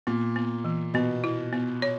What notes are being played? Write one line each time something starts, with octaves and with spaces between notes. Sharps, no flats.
A#2 B3
B3
E3
B2 B3
E4
B3
C#5